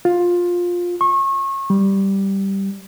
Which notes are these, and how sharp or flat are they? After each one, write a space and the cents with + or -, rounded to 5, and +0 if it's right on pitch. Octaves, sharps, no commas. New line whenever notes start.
F4 +15
C#6 -30
G3 -5